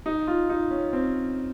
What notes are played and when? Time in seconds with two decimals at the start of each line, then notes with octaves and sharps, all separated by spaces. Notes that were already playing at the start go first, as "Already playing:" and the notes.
0.06 D#4
0.27 F4
0.50 D#4
0.71 C#4
0.93 C4